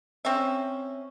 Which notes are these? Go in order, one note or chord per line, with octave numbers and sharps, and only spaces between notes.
C4 C#4 E5